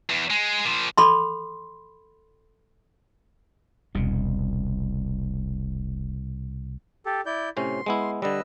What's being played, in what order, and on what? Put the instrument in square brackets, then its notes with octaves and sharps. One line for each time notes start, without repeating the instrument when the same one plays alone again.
[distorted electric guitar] E2
G#3
A#2 F3
[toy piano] A4 B5 C6
[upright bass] E1 [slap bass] C2 B2
[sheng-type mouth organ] G4 A4
E4 D5 G6
[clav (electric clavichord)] A2 C3 C#4 [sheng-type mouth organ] C6
[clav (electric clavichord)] G#3 B3 E4
[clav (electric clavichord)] D3 G3 [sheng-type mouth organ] B4 D#5 E6